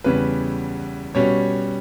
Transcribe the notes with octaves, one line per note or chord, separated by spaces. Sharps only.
E2 C#3 G3 B4
B2 G3 C#4 C#5